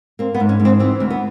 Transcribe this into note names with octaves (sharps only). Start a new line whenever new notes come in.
A#3 C4
B3
G#2
C#4
G#2
C4
E3 C4
D2
B3